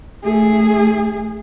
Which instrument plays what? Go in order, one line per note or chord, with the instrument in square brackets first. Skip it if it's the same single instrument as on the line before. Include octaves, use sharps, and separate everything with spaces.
[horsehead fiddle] A3 G#4